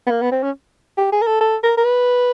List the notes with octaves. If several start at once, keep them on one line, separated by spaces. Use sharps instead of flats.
B3
A#3
B3
C4
C#4
G4
G#4
A#4
A4
A4
A#4
A#4
B4